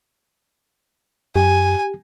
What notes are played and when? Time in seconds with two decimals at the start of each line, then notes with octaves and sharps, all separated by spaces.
1.36 F#2 G4 G#5